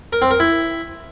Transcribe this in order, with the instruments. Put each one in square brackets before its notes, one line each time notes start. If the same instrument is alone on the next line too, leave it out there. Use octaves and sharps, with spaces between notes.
[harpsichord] A#4
C4
A#4
E4